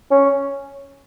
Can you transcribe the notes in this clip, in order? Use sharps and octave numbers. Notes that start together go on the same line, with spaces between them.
C#4